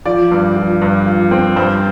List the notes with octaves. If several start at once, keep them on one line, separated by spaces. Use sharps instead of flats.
F3 D5
G2
F3
G2
F3
C4
G2 C5